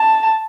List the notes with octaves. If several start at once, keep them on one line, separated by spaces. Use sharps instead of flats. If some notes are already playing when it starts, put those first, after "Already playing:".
Already playing: A5